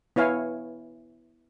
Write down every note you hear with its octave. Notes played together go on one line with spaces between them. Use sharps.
B3 E4 C#5 F5 G#5